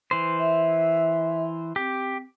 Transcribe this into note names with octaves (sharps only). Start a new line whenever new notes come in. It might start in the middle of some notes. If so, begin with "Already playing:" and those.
E3 C5
E5
C4 G4